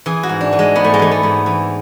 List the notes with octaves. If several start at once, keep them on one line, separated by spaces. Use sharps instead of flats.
E3 G#4
F#4
G#2
D4
E3
G#3
G#2 B3
A3
G#3
E3 A3
B3
G#2
E3